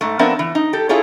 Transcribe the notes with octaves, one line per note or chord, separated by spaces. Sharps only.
G#2 A3
F3 B3 C4 D4 A#4 E5
E3
D#4
G4 A4
E4 F4 G#4 A4 C#5